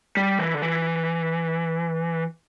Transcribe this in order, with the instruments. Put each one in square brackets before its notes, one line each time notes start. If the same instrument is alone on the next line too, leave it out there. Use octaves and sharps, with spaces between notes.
[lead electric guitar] G3
E3
D3
E3